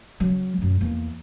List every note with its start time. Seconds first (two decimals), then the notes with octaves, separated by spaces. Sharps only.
0.20 C#3 F#3
0.58 F#2 A3
0.81 E2 A#3